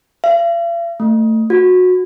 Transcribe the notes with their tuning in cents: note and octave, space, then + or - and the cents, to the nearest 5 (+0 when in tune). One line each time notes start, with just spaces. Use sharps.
F5 -45
A3 +20
F#4 -20